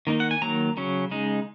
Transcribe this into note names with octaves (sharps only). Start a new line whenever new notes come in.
D#3 A#3 D#4
F#5
G#5
D#3 F#3 A#3 A#5
C#3 F#3 C#4
C#3 G#3 D#4